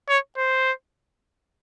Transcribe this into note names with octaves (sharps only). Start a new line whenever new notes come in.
C#5
C5